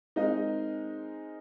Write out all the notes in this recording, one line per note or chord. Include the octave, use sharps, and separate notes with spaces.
G#3 C4 D#4 A#4 D#5